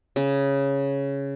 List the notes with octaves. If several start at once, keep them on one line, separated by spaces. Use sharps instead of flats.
C#3